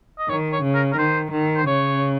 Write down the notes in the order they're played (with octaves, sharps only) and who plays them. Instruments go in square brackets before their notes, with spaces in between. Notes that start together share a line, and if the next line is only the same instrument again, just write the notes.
[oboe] D#5
[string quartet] D#3 [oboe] C#5
[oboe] C#5
[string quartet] C#3
[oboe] A#4
A#4
[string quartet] D#3 [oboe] C5
[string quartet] D#3
[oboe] C5
[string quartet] C#3 [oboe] C#5